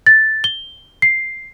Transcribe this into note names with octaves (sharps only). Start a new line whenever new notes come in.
A6
G7
C7